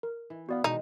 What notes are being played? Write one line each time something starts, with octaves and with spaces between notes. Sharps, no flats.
A#4
E3
B3 F#4 D5 F5
B2 D#3 E3 G#3 D#4